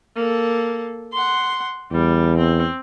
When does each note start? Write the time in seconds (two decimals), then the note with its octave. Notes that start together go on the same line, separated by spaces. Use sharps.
0.16 A#3 A4
1.13 F#5 C6
1.92 E2 G3
2.38 C4